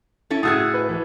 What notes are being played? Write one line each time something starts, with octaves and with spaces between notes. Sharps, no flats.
C#4 E4 A4
A2 F#4 G#4 D#6 E6 G#6
B4
E3